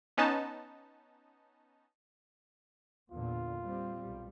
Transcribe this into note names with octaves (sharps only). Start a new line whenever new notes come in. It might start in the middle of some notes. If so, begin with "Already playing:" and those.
B3 C#4 D#4 A5
E2 A#2 D3 F4
G3 C4
B1 G3